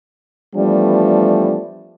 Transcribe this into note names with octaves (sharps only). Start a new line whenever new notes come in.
E3 F3 G3 A3 B3 D4